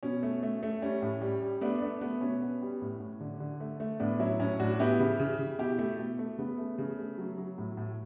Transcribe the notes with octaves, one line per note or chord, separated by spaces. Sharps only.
B2 C#4
A3
A3
A3
G3 C#4
A2
G3
G3
A3 B3 D4
A3 B3 D4
A3 B3
B2 C#4
B3
G3
A2
A2
D3
D3
A3
A3
A2 B3 D4
F#3 C#4 E4
A2 C#4
A2 D4 F#4
B3 E4 G4
C#3
C#3
C#3
B2 E4 G4
A3
B2
A3
C#3 B3
A3
C#3
A3
F#3
F#3
A2
A2